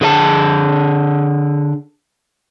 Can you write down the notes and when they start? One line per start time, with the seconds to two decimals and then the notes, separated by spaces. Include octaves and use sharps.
0.01 D3 G#4 D#5 A5